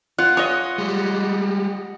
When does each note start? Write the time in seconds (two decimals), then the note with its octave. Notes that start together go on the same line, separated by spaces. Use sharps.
0.18 F4 F#5
0.37 C#5 D#5 D#6
0.78 G3 G#3